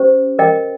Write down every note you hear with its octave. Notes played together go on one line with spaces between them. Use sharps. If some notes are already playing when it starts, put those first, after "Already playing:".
Already playing: C#4 G4 C5
A#4 D#5 G5